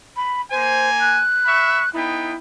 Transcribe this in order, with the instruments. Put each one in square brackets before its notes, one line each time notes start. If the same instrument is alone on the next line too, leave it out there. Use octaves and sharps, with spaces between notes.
[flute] B5
[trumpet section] A#3 G#5 [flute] C5
[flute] F#6
[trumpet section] E5 B5 C#6
[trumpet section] B3 D#4 G5 [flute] E4